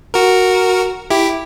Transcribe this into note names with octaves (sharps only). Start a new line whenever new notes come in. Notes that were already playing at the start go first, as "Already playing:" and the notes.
F#4 A#4
E4 G4